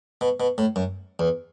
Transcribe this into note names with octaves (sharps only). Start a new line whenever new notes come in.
B2
B2
A2
F#2
E2